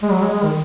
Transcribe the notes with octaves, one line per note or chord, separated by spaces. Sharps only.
G#3
F#3
G#3
G#3
D#3